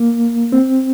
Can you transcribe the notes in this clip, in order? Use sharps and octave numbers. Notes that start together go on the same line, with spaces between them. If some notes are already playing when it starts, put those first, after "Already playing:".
Already playing: A#3
C4